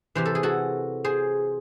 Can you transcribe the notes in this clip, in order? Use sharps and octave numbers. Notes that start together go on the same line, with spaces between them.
C3 E3 C5
A4
G#4
F#4 A4
G#4 C5